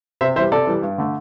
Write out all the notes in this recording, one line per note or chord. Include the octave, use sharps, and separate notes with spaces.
C3 C5 E5
E3 G3 C5 E5
C3 A4 D5
E3 G3
G2
D3 A3